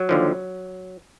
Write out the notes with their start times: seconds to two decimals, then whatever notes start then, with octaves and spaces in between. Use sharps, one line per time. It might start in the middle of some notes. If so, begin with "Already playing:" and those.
Already playing: F#3
0.09 D#2 D3 F3